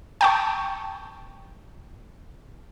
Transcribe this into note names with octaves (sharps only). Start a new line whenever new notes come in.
G5 A5 C#6